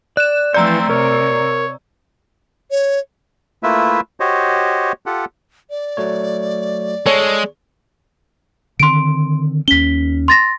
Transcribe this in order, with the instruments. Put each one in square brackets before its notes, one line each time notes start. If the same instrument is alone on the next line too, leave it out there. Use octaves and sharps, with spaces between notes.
[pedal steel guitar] D5 [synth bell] F#6 E7
[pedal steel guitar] E3 G6 [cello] F3 A3 [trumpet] C4 [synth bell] D5 A#5 E6
[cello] C3 [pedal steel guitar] A#4 [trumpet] C#5
[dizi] C#5
[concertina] A3 A#3 E4 F4 B4 E5
F#4 G4 C5 C#5 D#5
F4 G4 A4 F#5
[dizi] D5
[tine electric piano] F#3 A3 C#5
[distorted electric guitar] G#3 [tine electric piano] A4 [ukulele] C#5
[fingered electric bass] D3 D#3 C4 [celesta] C6 D7
[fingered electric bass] D#2 C#4 [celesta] B6 G7
[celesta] C6 A6 A#6